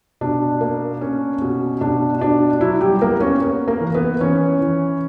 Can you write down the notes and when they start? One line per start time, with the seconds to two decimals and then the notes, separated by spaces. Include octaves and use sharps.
0.21 B2 D4
0.61 A#3
1.01 C#4
1.42 B2
1.81 B2 D4
2.21 B2 D4
2.61 F#3 E4
2.81 G3 G4
3.01 A#3 B3 A#4
3.21 C#4 C#5
3.41 B3
3.68 A#3 A#4
3.80 E3
3.95 B3 B4
4.20 E3 C#4 C#5
4.61 E3